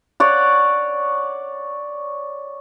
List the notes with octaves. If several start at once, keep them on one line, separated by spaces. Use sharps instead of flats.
C#5 D5 F#5